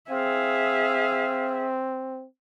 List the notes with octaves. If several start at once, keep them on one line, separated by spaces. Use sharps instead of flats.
C4 G#4 E5 F5